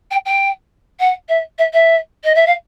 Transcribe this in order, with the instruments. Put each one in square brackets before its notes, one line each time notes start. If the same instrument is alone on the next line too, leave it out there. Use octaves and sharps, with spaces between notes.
[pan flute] G5
G5
F#5
E5
E5
E5
D#5
E5
F5